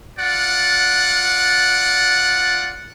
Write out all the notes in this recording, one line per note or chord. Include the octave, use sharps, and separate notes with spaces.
F4 D5 F#5